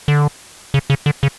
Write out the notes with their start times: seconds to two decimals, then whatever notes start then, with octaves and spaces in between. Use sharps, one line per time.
0.08 D3
0.74 C#3
0.90 C#3
1.06 D3
1.23 C#3